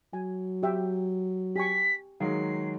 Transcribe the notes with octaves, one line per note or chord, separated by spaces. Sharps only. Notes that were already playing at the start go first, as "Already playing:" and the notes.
F#3 G#5
G4 E5 G5
G4 G#5 C#6 B6
D#3 F#3 G#3 F5 C7